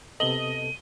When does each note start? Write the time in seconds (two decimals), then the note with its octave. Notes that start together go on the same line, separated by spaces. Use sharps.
0.20 C3 B3 A4 D#5 F#7 G7
0.40 D#7